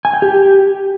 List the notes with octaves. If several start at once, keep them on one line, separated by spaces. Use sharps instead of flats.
G#5
G5
G4